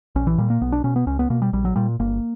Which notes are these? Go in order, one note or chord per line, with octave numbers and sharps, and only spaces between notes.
A#1 C#4
E3
A#2 G3
A#3
B1 B3
D4
B2 C#4
B3
C#2 C#4
B3
B2 A#3
G3
A#1 G3
F#3
A#2 G3
G1 A#3